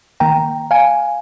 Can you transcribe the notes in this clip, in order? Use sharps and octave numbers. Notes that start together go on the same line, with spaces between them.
D#3 A#3 G5 A#5
F5 G#5